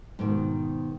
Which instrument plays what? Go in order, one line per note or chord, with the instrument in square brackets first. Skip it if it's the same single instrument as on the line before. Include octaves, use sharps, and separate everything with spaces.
[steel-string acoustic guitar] G#2 B2 D3 D#3